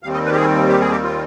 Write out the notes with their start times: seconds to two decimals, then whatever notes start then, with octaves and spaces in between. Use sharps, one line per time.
0.03 D#2 D#3 G3 C4 F5
0.14 D#5
0.26 B4
0.32 G4
0.36 G#4
0.69 G4
0.80 G#4
0.91 G4
1.03 F4